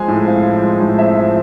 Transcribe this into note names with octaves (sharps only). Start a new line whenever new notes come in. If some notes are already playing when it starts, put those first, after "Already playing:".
Already playing: F3 G#3 C4 G#5
A2
C4 F5
F3
G#3
A2
C4 E5
F3